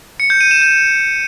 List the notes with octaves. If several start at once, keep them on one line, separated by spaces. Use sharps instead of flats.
C#7
G6
D#7
E7
G6